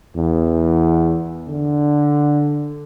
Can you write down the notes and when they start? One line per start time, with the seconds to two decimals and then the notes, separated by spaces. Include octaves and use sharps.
0.16 E2
1.48 D3